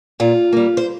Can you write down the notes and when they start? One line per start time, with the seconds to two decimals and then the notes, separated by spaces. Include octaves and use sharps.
0.20 A#2 F4
0.53 G3 A#3
0.77 C5